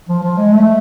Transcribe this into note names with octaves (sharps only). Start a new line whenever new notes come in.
F3
F3
G#3
A3